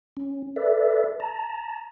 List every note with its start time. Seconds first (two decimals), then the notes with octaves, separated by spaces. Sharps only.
0.17 C#4
0.56 A4 B4 D5 E5
1.20 A5 A#5